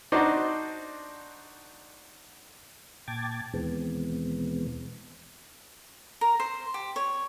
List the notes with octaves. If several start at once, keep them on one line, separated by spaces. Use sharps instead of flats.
D4 D#4 F#4 C5 D5
A#2 G5 A5 D6 G#6 A6
D#2 B2 E3 G#3 B3 C4
A#4
C5
G4
C#5